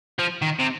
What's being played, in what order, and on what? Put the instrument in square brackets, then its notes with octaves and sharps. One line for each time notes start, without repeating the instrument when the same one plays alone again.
[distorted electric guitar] F3
D#3
C3